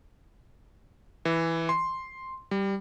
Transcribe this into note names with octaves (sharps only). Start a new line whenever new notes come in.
E3
C6
G3